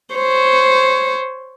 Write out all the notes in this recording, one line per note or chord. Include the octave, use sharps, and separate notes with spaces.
C5 C#5